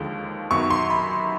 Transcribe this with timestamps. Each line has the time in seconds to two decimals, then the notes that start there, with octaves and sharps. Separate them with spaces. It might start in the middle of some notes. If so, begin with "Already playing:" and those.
Already playing: D#2 D3 F3 G#3
0.51 F#2 D#3 F#3 B3 C#6
0.70 C6
0.90 B5